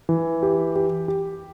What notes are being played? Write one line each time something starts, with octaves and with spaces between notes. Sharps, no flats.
E3
G4
G4
G4